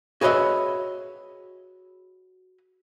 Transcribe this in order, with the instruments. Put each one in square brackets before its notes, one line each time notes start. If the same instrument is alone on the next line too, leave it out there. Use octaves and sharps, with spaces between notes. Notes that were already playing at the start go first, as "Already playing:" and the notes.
[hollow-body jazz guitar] F#4 G#4 B4 C#5 D#5 E5